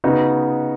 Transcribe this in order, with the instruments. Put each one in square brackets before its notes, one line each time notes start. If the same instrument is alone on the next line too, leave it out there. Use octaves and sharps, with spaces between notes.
[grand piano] C#3 B3 D#4 F#4